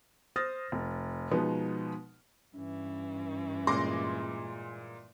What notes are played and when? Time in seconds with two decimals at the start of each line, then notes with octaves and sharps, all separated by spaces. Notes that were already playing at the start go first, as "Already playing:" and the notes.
0.36 C5 D#6 F6 A6 A#6
0.72 F1
1.31 B2 F3 G#3 B3 D#4
2.55 G2 E3 C#4
3.67 A#2 G#3 C6 D6 A#6